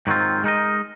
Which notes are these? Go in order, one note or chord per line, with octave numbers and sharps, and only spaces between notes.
G#2 D#3 F#3 C4 F4
G#3 D#4 A#4 D#5